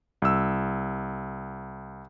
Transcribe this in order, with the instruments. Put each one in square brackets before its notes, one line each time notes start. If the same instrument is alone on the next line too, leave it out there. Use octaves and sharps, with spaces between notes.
[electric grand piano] C2 E6